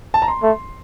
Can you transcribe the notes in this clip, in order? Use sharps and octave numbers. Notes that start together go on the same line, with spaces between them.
A5
A#5
C6
A3